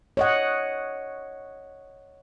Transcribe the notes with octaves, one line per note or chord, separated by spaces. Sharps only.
C#5 D#5 F#5